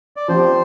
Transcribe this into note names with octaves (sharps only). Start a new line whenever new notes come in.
D5
F3 C4 G4 C5